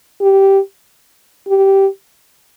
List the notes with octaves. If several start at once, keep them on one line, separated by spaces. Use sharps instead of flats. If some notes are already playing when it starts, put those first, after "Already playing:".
G4
G4